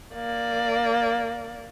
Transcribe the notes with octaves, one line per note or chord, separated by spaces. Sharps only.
A#3 D5